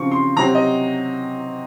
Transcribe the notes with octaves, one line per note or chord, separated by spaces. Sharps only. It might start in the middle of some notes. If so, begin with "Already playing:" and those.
Already playing: C#3 F3 C4 C#6
C6
C3 F#3 C4 A#5
D#5